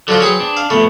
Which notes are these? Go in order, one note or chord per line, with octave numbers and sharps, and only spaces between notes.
D3 F3 F#3 F4
C4 G#4 B4
D4
F5
F2 A3 B3